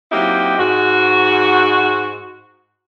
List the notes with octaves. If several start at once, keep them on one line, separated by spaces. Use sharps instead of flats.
F#3 A#3 C4 D#4 E4 G4
G#2 F#4